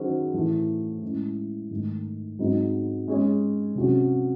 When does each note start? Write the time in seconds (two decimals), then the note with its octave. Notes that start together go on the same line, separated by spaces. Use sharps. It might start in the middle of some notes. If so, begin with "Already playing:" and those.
Already playing: D#3 F#3 C#4 G#4 C5
0.33 A2 E3 A3
1.03 A2 G#3 C#4
1.70 G#2 D#3 A3
2.39 G#2 F#3 C4 D#4 G#4
3.08 G#3 C#4 G#4 C#5
3.75 C3 F#3 C#4